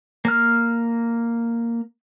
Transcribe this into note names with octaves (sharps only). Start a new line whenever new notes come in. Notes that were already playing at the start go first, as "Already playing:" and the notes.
A#3 F6